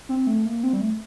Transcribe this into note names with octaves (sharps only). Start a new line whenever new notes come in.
C4
A3
A#3
C4
G3
A3